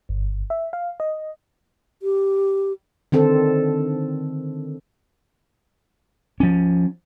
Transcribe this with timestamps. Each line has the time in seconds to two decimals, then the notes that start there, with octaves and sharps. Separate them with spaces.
0.09 G1
0.50 E5
0.73 F5
1.00 D#5
2.01 G4
3.12 D3 D#3 C4 A4
6.40 F3 C#4